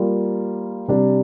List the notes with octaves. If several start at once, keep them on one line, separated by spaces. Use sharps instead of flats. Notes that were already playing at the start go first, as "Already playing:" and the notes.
Already playing: G3 A#3 F4
C3 G3 D4 G4